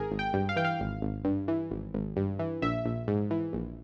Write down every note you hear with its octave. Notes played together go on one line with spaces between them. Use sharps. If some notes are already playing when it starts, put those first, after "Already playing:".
Already playing: G#1 G#4 A#4
G#1
G5
G2
F5
E3 G5
F5
G#1
G#1
G2
E3
G#1
G#1
G2
E3
A#1 E5
A#1
G#2
E3
A#1